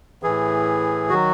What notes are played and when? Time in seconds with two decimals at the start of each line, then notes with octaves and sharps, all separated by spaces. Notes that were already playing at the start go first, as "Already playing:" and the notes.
0.23 A2 E3 G#4
1.09 D#3 F#3 F#4